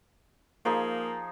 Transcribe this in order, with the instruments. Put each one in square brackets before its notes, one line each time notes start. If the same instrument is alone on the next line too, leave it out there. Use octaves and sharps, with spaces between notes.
[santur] F3 D#4 G#4 [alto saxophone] A#3